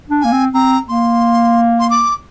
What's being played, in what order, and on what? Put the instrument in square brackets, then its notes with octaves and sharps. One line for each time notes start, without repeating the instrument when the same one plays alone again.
[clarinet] D4
[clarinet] A#3 [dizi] G#5
[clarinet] C4
[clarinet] C4 [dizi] A#5
[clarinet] A#3 [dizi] C6
[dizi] C6
D6